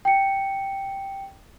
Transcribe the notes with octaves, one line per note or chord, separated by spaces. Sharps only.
G5 C#7